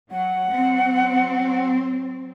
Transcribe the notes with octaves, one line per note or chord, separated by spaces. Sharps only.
F#3 F#5
F#3 C4